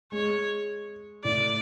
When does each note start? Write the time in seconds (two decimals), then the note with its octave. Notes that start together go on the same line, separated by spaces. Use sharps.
0.12 G#3 C#5
1.24 A2 D5